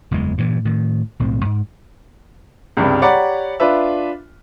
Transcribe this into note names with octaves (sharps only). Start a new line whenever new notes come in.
F#1 E2 E3 G#3
G2 A#2 E3
A2 D#3
B1 A2 C4
G#2
C#2 G2 C3 G3
G4 C#5 D5 F#5 A#5 B5
D4 F4 B4 E5